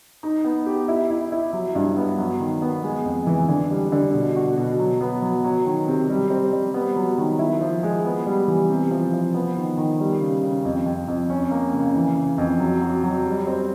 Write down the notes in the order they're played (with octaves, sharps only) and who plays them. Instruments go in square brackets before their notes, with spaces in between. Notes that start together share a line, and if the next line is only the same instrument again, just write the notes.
[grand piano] D#4
B3
G4
E4
E4
E4
F#3
G2
B3
F#3
D#3
B3
G#3
F2
E3
D3
G3
D3
B2
F#4
B2
F#3
B3
F#3
F#3
D#3
C3
G3
C4
G3
B3
F#3
D#3
E4
F3
G#3
B3
G3
E3
C3
F3
F3
B3
D#3
D#3
G3
C#3
C#3
F2
F2
F2
C#4
A#3
C#3
E3
C#3
F2
F#3
F#3
F#3
G3
C4